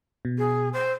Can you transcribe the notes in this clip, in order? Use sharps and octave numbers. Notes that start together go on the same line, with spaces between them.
B2
G#4
C5